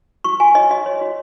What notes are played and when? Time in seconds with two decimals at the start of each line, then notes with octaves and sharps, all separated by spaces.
0.24 F#4 C#6
0.40 F#4 G#5
0.55 C#5 D#5
0.70 F#4 D#5
0.86 C#5
1.01 F#4